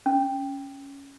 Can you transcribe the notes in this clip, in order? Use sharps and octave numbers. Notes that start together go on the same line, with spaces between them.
C#4